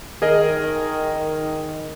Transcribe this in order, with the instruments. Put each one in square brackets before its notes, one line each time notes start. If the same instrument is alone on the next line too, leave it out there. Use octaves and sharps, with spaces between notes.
[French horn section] D#3 [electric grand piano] G#4 A#4 D#5